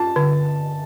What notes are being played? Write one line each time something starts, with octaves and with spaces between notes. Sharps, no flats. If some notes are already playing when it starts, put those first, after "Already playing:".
Already playing: F4 A5
D3